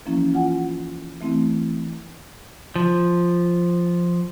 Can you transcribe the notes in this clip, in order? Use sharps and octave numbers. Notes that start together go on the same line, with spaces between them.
E3 F3 A#3 C#4 E4
F4 F#5 G#5
E3 A3 C4 E4
F3